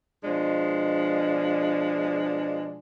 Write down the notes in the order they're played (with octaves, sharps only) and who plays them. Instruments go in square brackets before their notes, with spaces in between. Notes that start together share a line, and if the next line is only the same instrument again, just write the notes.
[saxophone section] B2 F3 G#3 D4